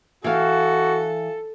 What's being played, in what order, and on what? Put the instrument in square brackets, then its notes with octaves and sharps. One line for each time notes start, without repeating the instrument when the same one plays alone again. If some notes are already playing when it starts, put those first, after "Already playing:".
[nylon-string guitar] E3 F5 [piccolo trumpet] F#4 [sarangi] A4